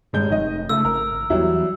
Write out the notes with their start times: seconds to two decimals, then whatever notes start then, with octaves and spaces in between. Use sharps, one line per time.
0.13 D#1 G2 G#3 G6
0.30 F1 D#3 D#5
0.69 C#2 A3 E6
0.85 G#1 A#4
1.12 G#1
1.30 E2 F#3 G3 E4